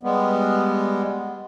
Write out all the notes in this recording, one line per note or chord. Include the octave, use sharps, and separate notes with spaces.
G3 G#3 B3